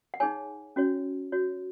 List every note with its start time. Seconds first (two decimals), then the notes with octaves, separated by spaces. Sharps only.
0.14 F#5
0.20 D#4 G#4 C#5 G#5
0.76 C#4 F#4 C#5
1.32 F#4 C#5